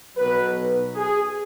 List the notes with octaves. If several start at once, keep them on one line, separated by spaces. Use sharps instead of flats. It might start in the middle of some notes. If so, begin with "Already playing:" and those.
B1 B2 F#3 B4
G#4